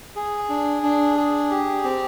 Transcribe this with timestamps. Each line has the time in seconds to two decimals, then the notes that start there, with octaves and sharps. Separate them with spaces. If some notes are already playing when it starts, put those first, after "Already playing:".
0.16 G#4
0.49 D4
0.83 D4
1.17 G#4
1.50 G4
1.84 C4